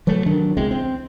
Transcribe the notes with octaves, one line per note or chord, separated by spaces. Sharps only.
E3 F#3 A3
D#3 F#3 D4
C#2 E3 G#3 C4
C4